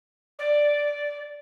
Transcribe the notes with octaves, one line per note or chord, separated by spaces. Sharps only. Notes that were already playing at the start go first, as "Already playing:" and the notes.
D5